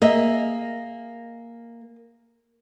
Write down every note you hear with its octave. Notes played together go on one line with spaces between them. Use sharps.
A#3 G#4 D#5 E5